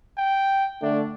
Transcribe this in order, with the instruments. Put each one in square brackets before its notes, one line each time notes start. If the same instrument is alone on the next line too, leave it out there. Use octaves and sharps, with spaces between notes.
[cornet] G5
[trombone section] D3 A3 [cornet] D4